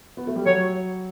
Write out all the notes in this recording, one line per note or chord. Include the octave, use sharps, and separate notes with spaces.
B3
A3
G3
F#3 C#5